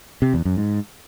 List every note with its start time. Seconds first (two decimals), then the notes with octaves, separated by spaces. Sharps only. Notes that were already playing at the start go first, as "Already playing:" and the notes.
0.22 C3
0.34 E2
0.45 F#2
0.57 G#2